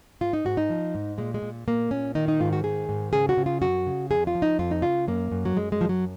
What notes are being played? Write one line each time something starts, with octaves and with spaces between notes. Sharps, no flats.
G#2 F4
D#4
G#2 F#4
D#4
F3
G#2
A#2 G#3
G#3
A#2
A#2 A#3
A#2 C#4
D#3 D#4
D#4
G#2 F4
F#4
D#3 G#4
G#2
C#3 G#4
F#4
C#3
F4
F#2 F#4
C#3
F2 G#4
F4
F3
D#4
F2 F4
D#4
C#3 F4
F#2 A#3
F#2
F#3
F#2 G#3
G#3
F3
F#3